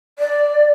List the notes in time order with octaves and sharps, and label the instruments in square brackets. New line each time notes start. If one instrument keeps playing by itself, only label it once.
[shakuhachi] D5